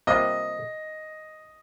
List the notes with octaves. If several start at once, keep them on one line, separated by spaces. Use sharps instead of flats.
C3 G3 A#3 F4 D#5